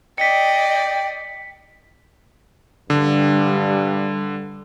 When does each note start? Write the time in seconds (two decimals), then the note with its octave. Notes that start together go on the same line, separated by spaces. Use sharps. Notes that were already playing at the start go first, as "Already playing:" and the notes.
0.18 D5 D#5 G5 B6 C#7
2.90 G2 D3 G3